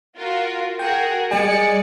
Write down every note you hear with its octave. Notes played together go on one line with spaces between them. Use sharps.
F4 F#4 A#4
F#4 G#4 A#4 G5
G3 G#3 D5 G#5 C#7